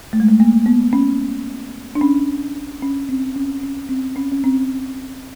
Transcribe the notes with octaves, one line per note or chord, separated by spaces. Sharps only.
A3
G#3
A3
A#3
B3
C#4
D4
C#4
C#4
C4
C#4
C#4
C4
C#4
C#4
C4